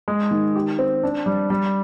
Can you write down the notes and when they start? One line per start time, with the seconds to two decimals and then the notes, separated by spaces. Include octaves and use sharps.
0.08 G#3
0.31 D#3
0.55 G4
0.79 C4
1.03 D4
1.26 G3
1.50 G3